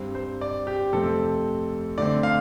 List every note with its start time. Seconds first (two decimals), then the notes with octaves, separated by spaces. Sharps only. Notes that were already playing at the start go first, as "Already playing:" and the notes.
Already playing: G2 G3 C4
0.15 C5
0.41 D5
0.67 G4
0.93 F2 C3 A3 C4 A4
1.98 D3 A3 C4 D5
2.23 F5